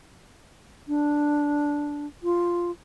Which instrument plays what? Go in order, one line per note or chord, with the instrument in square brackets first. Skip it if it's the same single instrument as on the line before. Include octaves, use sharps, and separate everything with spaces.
[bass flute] D4
F4